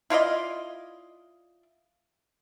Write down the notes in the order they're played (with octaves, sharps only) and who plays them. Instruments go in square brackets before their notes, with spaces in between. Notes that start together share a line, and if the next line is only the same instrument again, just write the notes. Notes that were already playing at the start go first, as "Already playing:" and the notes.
[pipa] E4 F4 D5 D#5